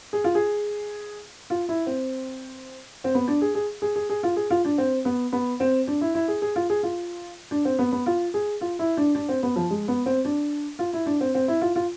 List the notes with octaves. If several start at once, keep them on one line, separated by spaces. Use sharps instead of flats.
G#4
F4
G#4
F4
E4
C4
C4
B3
D4
G#4
G#4
G#4
G#4
G#4
F4
G#4
F4
D4
C4
B3
B3
C4
D4
E4
E4
G#4
G#4
F4
G#4
F4
D4
C4
B3
B3
F4
G#4
F4
E4
D4
D4
C4
B3
F3
G#3
B3
C4
D4
F4
E4
D4
C4
C4
E4
F4
F4